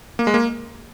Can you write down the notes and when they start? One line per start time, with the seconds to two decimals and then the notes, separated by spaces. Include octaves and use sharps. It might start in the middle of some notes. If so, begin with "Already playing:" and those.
0.19 A#3
0.27 G#3
0.34 A#3